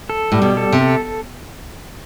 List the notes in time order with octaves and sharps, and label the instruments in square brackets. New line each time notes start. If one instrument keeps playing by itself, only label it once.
[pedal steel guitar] A4
[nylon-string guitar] A2 [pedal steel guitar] G3
[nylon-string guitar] B2
[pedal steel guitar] A4
[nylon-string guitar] C3
[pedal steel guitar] A4